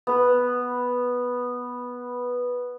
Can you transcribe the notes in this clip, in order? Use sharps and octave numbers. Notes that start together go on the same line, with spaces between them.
B3 B4